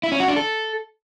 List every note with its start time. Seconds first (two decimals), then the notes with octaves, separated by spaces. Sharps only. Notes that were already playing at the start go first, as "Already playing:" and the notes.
0.03 E4
0.12 C#4
0.20 F#4
0.28 D4
0.36 A4